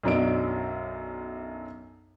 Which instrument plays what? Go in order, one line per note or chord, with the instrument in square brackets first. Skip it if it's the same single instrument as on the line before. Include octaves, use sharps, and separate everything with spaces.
[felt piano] B1 F#2 F#3 D4 D#5 D7